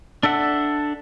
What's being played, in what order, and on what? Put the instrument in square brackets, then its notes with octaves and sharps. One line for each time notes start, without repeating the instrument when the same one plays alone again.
[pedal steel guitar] D4 A4 E5 F#5